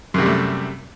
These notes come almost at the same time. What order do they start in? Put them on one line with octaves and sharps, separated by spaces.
F#2 C3 G3 A3